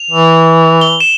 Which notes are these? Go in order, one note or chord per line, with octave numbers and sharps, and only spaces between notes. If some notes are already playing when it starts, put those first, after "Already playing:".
Already playing: F7
E3
G7
E7